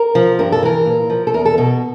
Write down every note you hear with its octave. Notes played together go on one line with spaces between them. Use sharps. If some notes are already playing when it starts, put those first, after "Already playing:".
Already playing: A#4
F3
G2 A#4
A4
E3 A#4
A#2
F3
A4
E2 A#4
A4
B2 A4